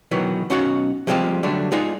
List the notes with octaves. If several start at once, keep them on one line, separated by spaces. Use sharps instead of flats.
B2 D#3 E3 F#3 B3
B1 C#4 D#4 F#4 F5 F#5
F3 G3 G#3 C4 F4 G4
D3 F#3 G3 A3 D4
G#3 D#4 F4 G#4 D5 F#5